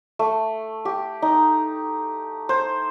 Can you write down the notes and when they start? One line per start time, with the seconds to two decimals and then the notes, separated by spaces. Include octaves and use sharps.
0.19 A3
0.85 G4
1.22 D#4
2.49 C5